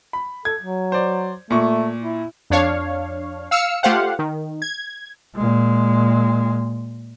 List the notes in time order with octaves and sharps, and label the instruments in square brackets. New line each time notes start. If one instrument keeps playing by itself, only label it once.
[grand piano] B5
[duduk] A4 [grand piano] G#6
[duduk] F#3
[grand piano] C5 D5
[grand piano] A#2 C#6 [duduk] A3
[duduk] E4
[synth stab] F2 D4 C#5 F5
F5 E6 F6 C#7
A3 F4 G4 C5 F5 F#5
D#3
G#6
[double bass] A#2 G#3